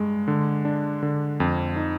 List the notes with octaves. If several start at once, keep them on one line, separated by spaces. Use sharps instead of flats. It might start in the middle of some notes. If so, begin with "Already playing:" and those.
Already playing: G2 G#3
D3
D4
D3
F2
D#4